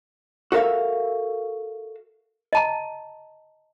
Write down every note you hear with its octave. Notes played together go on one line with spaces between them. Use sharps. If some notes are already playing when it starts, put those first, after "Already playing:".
F#4 A4 A#4 E5 F5
D#5 A5 A#5